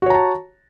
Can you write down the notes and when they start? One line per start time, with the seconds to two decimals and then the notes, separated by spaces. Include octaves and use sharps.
0.02 F#4
0.06 C#5
0.10 A#5
0.14 A5